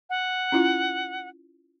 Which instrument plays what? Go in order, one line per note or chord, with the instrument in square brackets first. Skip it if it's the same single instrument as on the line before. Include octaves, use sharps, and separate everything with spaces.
[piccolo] F#5
[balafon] C#4 E4 F4